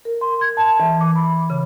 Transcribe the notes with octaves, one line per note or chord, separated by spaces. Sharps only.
A#4
C6
G#6
A5
E3
D6
B5
C#3